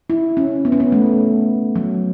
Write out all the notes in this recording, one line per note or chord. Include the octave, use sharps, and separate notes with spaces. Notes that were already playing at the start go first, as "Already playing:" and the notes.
E4
C#4
B3
C#4
B3
A3
F#3